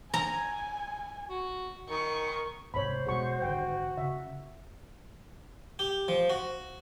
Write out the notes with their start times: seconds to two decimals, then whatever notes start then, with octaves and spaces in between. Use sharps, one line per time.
0.14 G#5 A#5
1.30 F#4
1.89 D#3 C#6
2.74 G#2 C3 C5 C#5 B5
3.07 B2 G#3 F#4 G#4 C#6
3.42 G#1 D3 G5
3.97 C#3 E5
5.79 G4
6.08 F3
6.30 F#4